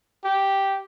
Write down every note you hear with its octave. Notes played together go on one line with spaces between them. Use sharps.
G4